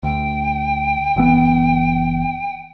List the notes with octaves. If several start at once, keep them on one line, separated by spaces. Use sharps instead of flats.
D2 G5
F#1 E3 B3